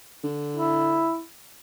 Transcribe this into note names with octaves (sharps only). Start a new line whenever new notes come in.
D3
E4